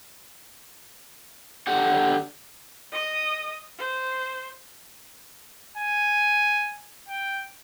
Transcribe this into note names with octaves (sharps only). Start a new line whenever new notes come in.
D3 G4 F#5
D#5 D#6
C5
G#5
G5